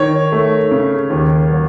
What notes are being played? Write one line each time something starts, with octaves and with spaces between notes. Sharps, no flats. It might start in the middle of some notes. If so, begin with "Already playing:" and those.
Already playing: D#3 C#5
A3
C#3
D#2
F#3